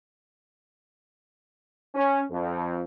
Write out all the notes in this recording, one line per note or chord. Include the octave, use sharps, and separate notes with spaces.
C#4
F2